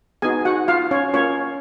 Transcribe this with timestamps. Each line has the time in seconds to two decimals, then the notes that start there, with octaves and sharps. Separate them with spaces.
0.22 B3 D#4 F#4 G#4 G#5
0.45 F#4 F#5
0.68 F4 F5
0.91 C#4 C#5
1.13 A#3 C#4 F4 C#5